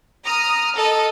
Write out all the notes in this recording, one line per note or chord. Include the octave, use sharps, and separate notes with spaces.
A#5 D#6 F6
A4 D#5